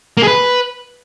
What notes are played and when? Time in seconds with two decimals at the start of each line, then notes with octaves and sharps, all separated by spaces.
0.17 A#3
0.22 G#4
0.28 B4